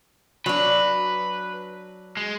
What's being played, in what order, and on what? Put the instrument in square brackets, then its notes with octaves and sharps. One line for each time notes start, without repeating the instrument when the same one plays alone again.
[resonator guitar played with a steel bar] F#3 D4 [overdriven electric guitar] B4
[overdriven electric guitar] G#3